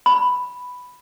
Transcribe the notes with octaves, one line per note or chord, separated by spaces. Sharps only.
B5